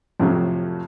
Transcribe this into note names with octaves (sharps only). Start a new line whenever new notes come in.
F2 A2 C3 F3 F#3